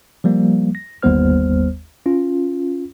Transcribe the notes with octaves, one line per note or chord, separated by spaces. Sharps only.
F3 G3 A#3
A#6
G1 D#2 G3 B3 C5 F6
C#4 F4